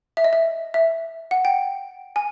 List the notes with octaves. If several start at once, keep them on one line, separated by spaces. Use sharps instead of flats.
E5
D#5
E5
E5
F#5
G5
G#5